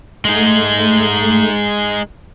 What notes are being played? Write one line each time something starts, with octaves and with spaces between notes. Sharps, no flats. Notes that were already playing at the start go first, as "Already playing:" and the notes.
G#3 A3 D#4